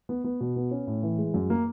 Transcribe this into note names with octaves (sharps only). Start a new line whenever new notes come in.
B3
B3
B2
B3
C#4
A2
E3
G#3
F#2
A#3